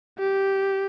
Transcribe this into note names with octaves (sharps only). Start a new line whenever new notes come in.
G4